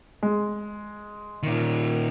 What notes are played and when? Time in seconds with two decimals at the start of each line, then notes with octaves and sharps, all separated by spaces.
0.23 G#3
1.43 A#2 D#3